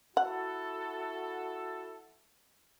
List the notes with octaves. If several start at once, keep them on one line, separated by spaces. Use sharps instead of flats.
E4 F#4 A4 F#5